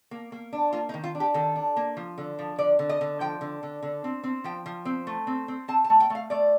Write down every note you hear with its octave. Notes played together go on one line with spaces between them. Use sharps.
A#3
A#3
D4
A#3 F4
D#4
D#3
F4
D4
G4
D#3 A4
D4
A#3
F3
D3
F3
D3 D5
D3
D#5
D3
F3 G5
D3
D3
D3
C4
C4
F3 G5
F3
C4
A3
C4
C4
C4 A5
A5
A3
G5
A3 F5
A3 D5